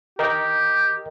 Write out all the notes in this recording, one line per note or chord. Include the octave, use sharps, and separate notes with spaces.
G4 A#4 D#5 G5